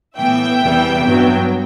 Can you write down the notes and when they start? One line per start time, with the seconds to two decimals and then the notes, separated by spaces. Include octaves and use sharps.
0.17 A2 E3 B3 E5 G5
0.60 E2 C3 E3 G3 B3
1.04 G2 F#3 B3